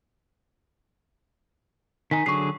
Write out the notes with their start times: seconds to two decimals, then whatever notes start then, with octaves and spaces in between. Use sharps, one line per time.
2.11 D#3 D#4 G#5 B6
2.26 D3 F#3 G#4 C#6 C7